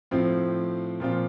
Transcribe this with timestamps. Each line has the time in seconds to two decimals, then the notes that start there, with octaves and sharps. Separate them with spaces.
0.11 A2 F3 C4 F4
1.00 A#2 F3 C4 F4